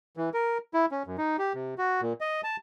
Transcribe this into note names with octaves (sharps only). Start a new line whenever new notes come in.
E3
A#4
E4
C#4
F#2
D#4
G4
C3
F#4
A#2
D#5
A5